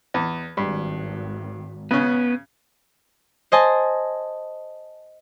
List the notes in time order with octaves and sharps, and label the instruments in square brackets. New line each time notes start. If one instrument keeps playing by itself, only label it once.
[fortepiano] E2
[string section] G#1 [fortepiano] G2
[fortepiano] C#3 C#4 [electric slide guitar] B3
[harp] C5 D#5 G#5 A5